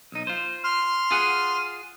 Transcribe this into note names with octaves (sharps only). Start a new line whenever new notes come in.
B1 D#4
F4 C5
C6 F6
F4 G#4 F#5